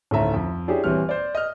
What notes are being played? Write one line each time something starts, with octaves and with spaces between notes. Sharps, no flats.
D1 D#3 A3 C#4 E5 A#5
F2
C#4 D4 E4 G4 G#4
D#1 E3 G3 C4 C#5 F6
C5 D5
D#5 F6